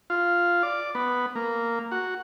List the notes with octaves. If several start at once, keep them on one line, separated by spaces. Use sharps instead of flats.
F4
D5
B3
A#3
F#4